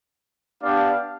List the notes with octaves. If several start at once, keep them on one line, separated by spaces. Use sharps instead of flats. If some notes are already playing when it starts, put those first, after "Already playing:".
B3 D4 G4 D5 F5